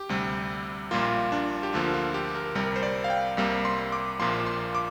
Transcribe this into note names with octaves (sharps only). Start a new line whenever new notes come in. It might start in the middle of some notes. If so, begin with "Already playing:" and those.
Already playing: G4
D2 C3 G3
A#1 A#2 G3 A#3 F4
D4
G4
D2 D3 F3 A#3 F4
F4
G4
A#4
C2 C3 G3 A#4
C5
D5
F5
G5
C2 C3 G3 A#3
C6
D6
A#1 A#2 F3 A#3 C6
C6
D6